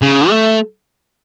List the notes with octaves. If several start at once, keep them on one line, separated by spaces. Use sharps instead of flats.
C#3
A3